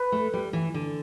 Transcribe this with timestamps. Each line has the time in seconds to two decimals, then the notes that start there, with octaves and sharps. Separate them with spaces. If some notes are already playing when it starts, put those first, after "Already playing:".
Already playing: B4
0.12 A3
0.33 G3
0.53 E3
0.74 D3